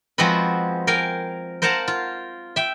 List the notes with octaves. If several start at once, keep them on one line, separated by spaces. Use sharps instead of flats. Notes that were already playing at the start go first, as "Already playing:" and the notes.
F3 G#3 B3 C4 F#4 B4
A#4 F5 G5 G#5
A#4 C5 F5 F#5 A5 A#5
F4
E5 G5